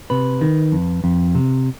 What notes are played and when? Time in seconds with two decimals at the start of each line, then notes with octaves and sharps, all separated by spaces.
0.10 C3 B4
0.41 D#3
0.72 F2
1.04 F2
1.35 C3